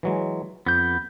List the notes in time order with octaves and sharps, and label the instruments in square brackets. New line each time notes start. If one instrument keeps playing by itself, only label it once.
[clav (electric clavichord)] E3 F#3 G#3
[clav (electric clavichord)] F2 [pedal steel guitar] B3 G6